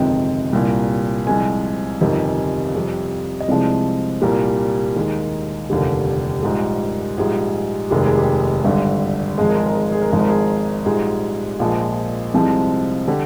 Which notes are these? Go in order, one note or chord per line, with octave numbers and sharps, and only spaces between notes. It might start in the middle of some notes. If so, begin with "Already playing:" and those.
Already playing: G1 F2 C3 D#3 G#3 G5
C2 A#2 G3
C2 C3 F3 G#3 G#5
G1 F2 C3 D#3 G3
F2 C3 G3
D#5
C2 C3 F3 G#3 D5
C2 A#2 G3 A#4
D#2 D#3 G#3
F1 D#2 D3 G3
A#1 G#2 G3
A#1 G#2 G3 G#4
F1 D#2 D#3 G#3 G4
G#4
G4
G#1 G2 D3
G#1 G#2 F3 G#3 G#4
A#4
G#4
A#4
G#4
A#4
G#4
A#4
G#1 G#2 F3 G#4
A#4
G#4
A#1 G#2 G3 G#4
A#1 A#2 F3 G#3
C2 C3 F3 G#3
D3 G3 G4